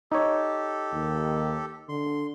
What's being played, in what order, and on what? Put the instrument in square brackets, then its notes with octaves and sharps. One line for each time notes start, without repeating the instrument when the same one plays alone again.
[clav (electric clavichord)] D#4 C#5 [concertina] G4 A4
[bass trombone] D#2
[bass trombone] D3 [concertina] C6